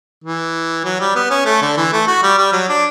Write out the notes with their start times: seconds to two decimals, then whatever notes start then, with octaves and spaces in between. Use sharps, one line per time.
0.24 E3
0.84 F#3
1.00 G3
1.15 B3
1.30 C#4
1.46 A3
1.62 D3
1.77 E3
1.92 A3
2.08 F#4
2.23 G3
2.38 G3
2.52 F#3
2.69 D4